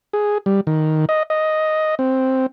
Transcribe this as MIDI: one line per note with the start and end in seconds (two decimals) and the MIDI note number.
0.13 0.38 68
0.46 0.61 55
0.67 1.05 51
1.09 1.23 75
1.30 1.95 75
1.99 2.46 60